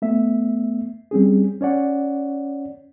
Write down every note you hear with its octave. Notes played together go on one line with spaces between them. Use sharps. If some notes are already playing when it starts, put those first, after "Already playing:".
A3 B3 E5
G3 C4 C#4 G#4
C#4 C#5 D5 F#5